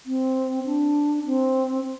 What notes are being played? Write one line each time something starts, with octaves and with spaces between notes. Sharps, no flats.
C4
D4
C4